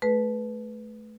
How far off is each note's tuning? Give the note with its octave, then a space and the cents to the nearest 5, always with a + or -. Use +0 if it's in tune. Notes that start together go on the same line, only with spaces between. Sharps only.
A3 -25 G#4 +45 B4 +0